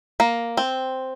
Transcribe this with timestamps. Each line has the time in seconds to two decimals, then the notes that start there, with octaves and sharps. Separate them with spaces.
0.20 A#3
0.57 C4